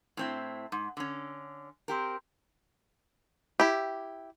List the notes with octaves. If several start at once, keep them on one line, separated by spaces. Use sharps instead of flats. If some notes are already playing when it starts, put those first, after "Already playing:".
A2 C4 E4
G#2
D3 C#4
C4 G4 A#4
E4 G4